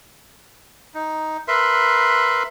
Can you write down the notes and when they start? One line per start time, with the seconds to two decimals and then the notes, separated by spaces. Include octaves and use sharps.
0.94 D#4
1.48 A#4 B4 E5 C6